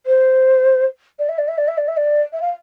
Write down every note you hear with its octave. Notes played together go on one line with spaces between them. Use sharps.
C5
D5
E5
D5
E5
D5
E5
D5
E5
D5
E5
F5